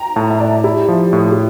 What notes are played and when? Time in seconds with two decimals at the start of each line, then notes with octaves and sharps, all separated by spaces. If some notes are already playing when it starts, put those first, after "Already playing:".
Already playing: G5 A#5
0.16 A2 A5
0.30 E5
0.40 A2 D5
0.64 E4 G4
0.88 F3
1.13 A2
1.32 G4